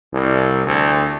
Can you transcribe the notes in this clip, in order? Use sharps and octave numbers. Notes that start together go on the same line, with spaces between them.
C2
D2